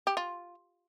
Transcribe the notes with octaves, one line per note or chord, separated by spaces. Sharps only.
G4
F4